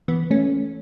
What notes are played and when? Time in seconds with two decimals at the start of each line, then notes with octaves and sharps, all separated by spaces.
0.08 E3 B3
0.31 A3 C#4